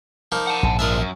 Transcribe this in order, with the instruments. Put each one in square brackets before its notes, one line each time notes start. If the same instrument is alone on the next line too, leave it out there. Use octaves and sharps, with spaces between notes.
[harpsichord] F3 A#3 D#4
[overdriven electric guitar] F#5 A5
[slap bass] A#1 G#2
[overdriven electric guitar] F3 D4 [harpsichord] A#4 D#5 E5
[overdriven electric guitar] F#2